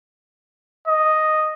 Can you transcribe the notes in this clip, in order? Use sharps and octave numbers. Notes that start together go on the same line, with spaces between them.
D#5